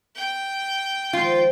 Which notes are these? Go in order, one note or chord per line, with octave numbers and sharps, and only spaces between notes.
G5
D#3 F3 G#3 F4